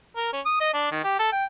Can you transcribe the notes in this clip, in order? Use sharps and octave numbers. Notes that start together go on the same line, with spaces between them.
A#4
C#4
D#6
D#5
D4
D#3
G4
A4
G5